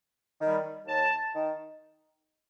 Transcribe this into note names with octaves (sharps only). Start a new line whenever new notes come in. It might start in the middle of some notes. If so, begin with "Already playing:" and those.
D#3 G3
D#2 A5
D#3